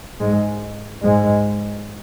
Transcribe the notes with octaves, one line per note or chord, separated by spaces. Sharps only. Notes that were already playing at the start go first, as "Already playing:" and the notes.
G#2 G#3
G#2 G#3